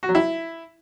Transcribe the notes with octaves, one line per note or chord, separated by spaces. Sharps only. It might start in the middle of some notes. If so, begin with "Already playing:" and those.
F#4
F#3
E4